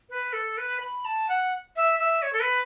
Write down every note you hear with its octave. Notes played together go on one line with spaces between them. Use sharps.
B4
A4
B4
B5
A5
F#5
E5
E5
C#5
A4
B4